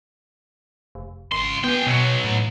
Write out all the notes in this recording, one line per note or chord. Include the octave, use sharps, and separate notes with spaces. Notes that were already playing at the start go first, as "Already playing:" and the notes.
F1
G#1 C#2 C6
B3 G#4 G5
B1 B2 F#3
A2